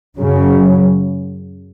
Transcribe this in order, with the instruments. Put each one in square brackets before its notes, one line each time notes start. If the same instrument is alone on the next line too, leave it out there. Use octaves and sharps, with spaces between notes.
[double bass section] F#2 C#3 F#3